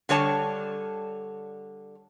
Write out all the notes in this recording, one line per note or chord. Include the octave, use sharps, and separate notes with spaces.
D3 G3 C#5 A5